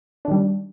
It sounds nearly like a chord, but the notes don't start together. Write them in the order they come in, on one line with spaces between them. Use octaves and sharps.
D4 D#3 G3